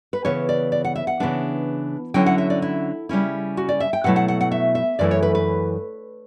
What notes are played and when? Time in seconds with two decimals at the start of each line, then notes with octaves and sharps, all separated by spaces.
0.13 B4
0.25 C#3 E3 B3 C#5
0.49 D5
0.72 D5
0.85 F#5
0.96 E5
1.07 F#5
1.20 C#3 E3 B3 D4
2.14 D3 F#3 C#4 E4 G5
2.26 F#5
2.38 E5
2.50 D5
2.62 E4
3.09 C#3 G3 C#4 E4
3.57 F#4
3.69 D5
3.80 E5
3.93 G5
4.04 B2 F#3 A3 E4 F#5
4.16 F#5
4.28 F#5
4.41 F#5
4.52 E5
4.75 E5
4.99 F#2 E3 A3 E4 D5
5.11 C#5
5.23 B4
5.35 B4